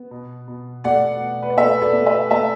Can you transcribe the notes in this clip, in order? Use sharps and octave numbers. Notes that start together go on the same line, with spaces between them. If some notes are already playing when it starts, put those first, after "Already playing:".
Already playing: B3
B2
B2
A3 D5 F#5
B2
B4
D5
A3 B4 E5
B4
A4 D5
A3
B4 E5
A3 E5 A5